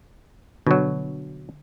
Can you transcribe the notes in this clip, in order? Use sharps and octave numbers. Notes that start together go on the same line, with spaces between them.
B2 D3 F#3